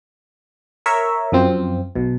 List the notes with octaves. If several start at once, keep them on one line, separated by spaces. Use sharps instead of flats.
A#4 C#5 E5
F#2 F3 C4
B1 B2